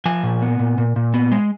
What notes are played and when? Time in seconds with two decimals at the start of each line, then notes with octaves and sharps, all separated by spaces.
0.06 F3 G#5
0.23 A#2
0.42 B3
0.60 A#2
0.78 A#2
0.96 A#2
1.14 B3
1.32 G#3